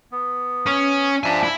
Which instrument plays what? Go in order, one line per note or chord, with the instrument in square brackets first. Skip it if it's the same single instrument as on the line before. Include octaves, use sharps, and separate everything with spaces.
[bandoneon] B3
[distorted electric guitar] C#4
[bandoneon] F3 D4 E5 [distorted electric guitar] G#5 A#5
[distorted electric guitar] E4